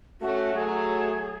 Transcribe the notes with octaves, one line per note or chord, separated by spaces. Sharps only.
A3 C#4 F#4
F#3 A3 G#4